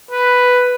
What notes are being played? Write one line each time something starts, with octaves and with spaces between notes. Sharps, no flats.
B4